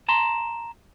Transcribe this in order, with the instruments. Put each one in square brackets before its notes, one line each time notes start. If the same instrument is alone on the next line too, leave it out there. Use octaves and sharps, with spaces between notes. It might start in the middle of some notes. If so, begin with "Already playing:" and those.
[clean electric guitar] A5 A#5 C6